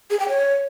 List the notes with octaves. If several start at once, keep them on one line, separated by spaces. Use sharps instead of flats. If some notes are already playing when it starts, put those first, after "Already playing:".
G#4
G5
C#5